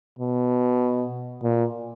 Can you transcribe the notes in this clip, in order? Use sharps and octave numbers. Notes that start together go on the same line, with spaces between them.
B2
A#2